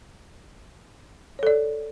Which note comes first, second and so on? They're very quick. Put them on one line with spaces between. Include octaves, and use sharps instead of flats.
C#5 A4 D5